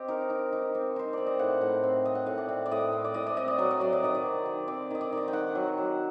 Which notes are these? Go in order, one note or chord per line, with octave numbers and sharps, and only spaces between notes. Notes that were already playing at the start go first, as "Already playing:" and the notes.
Already playing: C4 G4 D#5
D#4 A#4
D#4
D#4
C4
D#4 C5
C4 D5
D#5
A2 F#5
A2
C4
C4 D#5
F#5
A2 D#5
D5
C4
D5
A2 D#5
C4
D5
A2 D#5
D5
C4 D#5
D5
F#3 D#5
D5
F#3 D#5
D5
D#3 D#5
D5
C4
D#3
C4 D5
D#3 D#5
D5
D#3
D#5
G5
D#3 F#5
F#3
F#3